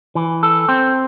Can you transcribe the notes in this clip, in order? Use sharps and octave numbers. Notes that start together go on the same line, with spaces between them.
E3
A4
C4